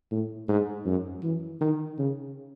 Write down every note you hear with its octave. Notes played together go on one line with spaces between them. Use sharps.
A2
G#2
F#2
E3
D#3
C#3